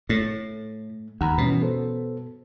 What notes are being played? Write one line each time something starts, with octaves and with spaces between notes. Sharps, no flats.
A2 A3
D#2 F#5 A#5 B5
G2 B2 E3 C#4
B3 A4 C5